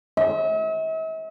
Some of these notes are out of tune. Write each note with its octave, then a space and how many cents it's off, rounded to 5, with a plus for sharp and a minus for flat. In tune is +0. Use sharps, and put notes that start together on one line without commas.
E5 -45